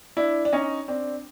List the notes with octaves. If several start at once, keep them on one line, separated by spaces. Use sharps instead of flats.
D4 E4
D4
C#4 D#4
C4 D4